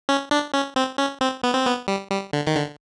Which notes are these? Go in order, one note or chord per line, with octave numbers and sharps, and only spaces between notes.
C#4
D4
C#4
C4
C#4
C4
B3
C4
B3
G3
G3
D3
D#3
D3